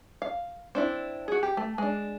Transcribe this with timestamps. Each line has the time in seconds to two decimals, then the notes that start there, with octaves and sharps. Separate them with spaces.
0.22 F5
0.75 C4 D4 E4
1.28 F#4 G#4
1.43 G4
1.57 A3
1.78 G#3 D4